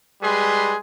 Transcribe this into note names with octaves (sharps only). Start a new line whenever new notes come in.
G3 G#3 G#4 B4 C6